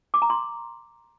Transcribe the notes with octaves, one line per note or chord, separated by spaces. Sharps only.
D6
A#5
C6